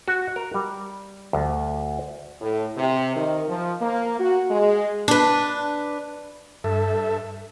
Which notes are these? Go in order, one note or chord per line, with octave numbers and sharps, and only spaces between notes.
F#4
A#4
G3
D2
A2
C3
D#3
F3
A#3
F#4
G#3
D4 B4
G2 A4 E5